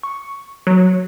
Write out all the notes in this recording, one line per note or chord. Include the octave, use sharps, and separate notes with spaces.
C#6
F#3